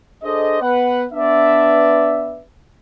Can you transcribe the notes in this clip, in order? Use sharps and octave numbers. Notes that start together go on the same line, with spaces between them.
D4 G#4 A4 C5 D5 D#5
B3 B4 F#5
B3 D4 B4 D5 E5